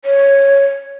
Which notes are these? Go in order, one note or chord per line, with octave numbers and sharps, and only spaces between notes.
C#5